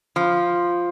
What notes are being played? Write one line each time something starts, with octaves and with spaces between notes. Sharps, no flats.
F3